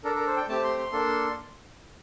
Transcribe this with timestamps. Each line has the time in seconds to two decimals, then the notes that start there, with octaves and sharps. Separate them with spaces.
0.04 D4 A4 A#4
0.15 A#4
0.27 C5
0.37 G5
0.48 A3 C4 G4 A5
0.64 C6
0.78 C6
0.92 A#3 D4 A4